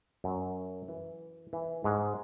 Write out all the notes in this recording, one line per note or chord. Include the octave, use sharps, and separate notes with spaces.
F#2 F#3
E3
E3
G#2 G#3